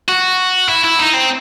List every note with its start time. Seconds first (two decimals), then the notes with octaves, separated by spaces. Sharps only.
0.09 F#4
0.69 E4
0.84 E4
0.99 D#4
1.14 C4